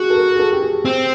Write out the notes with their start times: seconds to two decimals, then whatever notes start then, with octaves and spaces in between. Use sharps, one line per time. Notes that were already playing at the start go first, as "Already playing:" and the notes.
Already playing: F#4 G#4
0.10 A4
0.16 A#4
0.35 G#4
0.40 A4
0.53 G4
0.62 G#4
0.85 C4